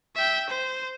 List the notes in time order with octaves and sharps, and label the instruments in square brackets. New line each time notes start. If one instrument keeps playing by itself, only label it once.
[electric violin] E5 G5
C5